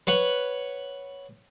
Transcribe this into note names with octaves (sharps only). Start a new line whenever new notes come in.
B4 C#5 F#5